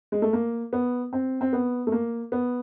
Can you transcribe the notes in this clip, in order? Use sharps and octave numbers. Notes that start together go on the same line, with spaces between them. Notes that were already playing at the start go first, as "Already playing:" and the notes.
G#3
A3
A#3
B3
C4
C4
B3
A3
A#3
B3